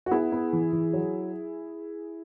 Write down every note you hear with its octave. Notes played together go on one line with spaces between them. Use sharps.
F#4
B3 E4 G#4
B3
E3
E3
F#3